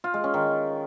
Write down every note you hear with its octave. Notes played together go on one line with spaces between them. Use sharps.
F4
G#3
C#4
D#3